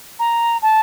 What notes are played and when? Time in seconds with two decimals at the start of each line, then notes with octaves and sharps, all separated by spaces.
0.19 A#5
0.62 A5